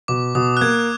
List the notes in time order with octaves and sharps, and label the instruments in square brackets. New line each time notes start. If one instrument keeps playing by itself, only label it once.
[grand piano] B2 [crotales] D6
[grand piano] B2 [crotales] D#6
[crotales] F#6
[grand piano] A#3 [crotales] G#6